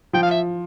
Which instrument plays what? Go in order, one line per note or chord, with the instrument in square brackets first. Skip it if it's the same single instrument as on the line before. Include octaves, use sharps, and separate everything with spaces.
[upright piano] F3 [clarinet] G5
[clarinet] F5
E5